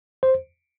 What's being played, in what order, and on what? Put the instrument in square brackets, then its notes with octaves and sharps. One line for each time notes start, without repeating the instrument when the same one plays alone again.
[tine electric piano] C5